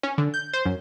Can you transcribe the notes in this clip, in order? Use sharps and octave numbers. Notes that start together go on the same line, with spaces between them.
C#4
D3
G6
C5
F#2